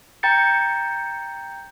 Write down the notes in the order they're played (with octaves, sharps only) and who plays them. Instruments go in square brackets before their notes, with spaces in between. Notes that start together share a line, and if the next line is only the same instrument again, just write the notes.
[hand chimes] G5 A#5 G6 A6 C#7